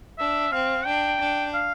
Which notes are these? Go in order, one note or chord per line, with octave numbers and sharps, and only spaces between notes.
D4 E5
C4 F5
D4 G5
D4
F5